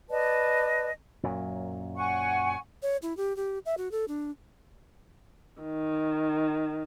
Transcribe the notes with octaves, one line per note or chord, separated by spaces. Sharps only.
B4 D5 D#5 A5
F#2 A#2 F#3
F#5 G#5 C#6
C#5
E4
G4
G4
E5
F#4
A4
D4
D#3